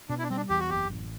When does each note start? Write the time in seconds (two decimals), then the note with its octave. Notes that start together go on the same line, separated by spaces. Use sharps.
0.09 B2 D4
0.19 E4
0.23 D4
0.30 G3 C4
0.37 D4
0.49 E2 G4
0.60 F#4
0.70 F#1 G4
0.90 A1